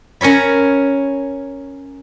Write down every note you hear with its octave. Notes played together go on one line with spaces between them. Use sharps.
C#4 A#4 C#5 B5